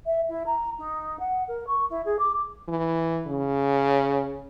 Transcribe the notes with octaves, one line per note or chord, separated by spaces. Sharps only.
E5
E4
A#5
D#4
F#5
A#4
C#6
E4
G#4
D6
E3
C#3